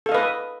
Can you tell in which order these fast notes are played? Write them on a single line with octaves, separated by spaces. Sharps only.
A4 F5 D#5 B4